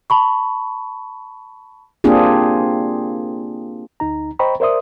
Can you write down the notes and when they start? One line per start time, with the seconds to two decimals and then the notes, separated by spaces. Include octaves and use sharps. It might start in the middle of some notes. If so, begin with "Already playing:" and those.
0.10 A5 B5 C#6
2.04 A#3 C4 D4 F4 G4 G#4
4.00 D2 D#4 A#5
4.39 C5 D#5 G5 A#5 B5 C#6
4.60 A#4 C5 D5 E5 C6 D#6